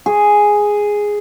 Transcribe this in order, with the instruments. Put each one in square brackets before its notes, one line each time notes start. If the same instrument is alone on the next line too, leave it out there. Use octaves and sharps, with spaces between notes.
[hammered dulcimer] G#4